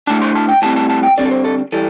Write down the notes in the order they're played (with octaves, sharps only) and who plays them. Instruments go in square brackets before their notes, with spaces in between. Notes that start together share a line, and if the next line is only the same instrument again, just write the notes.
[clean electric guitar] A2 A3 D4 A5
C6
A5
G5
A2 G3 C4 A5
A5
A5
G5
D3 G3 C4 D5
A4
C5
A4
E3 G3 A4